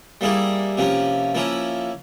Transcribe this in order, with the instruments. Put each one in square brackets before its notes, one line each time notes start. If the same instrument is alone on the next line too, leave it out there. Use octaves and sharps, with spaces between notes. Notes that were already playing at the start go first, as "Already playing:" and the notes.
[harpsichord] G3 A#3 E4 G#4
C3 F3 A#3 C#4
F3 A#3 C#4 E4